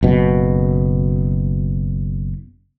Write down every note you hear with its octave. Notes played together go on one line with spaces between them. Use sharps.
F#1 B2